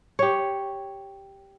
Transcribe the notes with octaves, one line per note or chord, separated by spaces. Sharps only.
G4 C#5